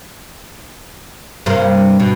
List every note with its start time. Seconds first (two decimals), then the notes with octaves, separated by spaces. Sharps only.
1.46 G2 C3 A#3
2.00 B2